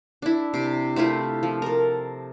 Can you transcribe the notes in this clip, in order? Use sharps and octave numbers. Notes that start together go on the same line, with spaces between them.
D4 E4
C3 D6
A3 C4 E4 F4
F3
A4 A#4